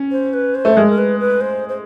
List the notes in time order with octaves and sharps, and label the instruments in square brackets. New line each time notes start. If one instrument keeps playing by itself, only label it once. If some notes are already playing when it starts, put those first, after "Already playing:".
Already playing: [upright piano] C#4
[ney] C5
B4
C5
[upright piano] A3
[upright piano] G#3 [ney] A#4
[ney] A#4
B4
B4
C5
C5